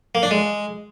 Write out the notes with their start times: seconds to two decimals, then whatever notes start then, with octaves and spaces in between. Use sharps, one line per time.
0.15 A#3
0.23 D4
0.31 G#3